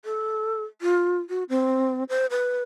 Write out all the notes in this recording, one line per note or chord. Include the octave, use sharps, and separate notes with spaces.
A4
F4
F#4
C4
C5
B4